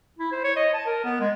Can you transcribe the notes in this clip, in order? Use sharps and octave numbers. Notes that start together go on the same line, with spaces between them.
E4
C5
C#5
D#5
A5
A#4
B3
G#3